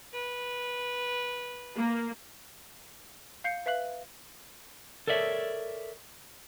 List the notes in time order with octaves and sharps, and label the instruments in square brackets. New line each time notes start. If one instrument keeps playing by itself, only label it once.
[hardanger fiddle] B4
[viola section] A#3
[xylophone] F5 G6 C7 C#7
B4 E5 F5 F#6 F#7
[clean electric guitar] A4 A#4 C#5 D5 E5